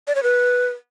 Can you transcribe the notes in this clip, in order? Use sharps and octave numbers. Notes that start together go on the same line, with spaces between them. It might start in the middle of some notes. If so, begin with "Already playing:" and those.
D5
C#5
B4